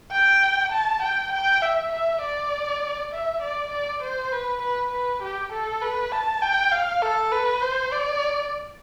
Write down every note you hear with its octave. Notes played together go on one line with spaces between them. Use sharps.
G5
A5
G5
G5
E5
E5
D5
E5
D5
D5
C5
B4
B4
B4
G4
A4
B4
A5
G5
F5
A4
B4
C5
D5